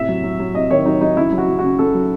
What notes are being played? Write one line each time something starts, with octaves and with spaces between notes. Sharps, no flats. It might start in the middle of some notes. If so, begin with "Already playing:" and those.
Already playing: A2 C3 E5
F#3
F#3
F#3
C3 D#5
D#3 C#5
F#3 D#4
F#3 D#4
C#3 E4
F#3
F#4
C#3
C#3 F#4
C#3 A4
F#3